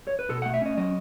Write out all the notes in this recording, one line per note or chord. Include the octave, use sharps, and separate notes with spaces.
C#5
B4
B2 A4
F#5
A3
E5
C#4 D#5
F#3 D#5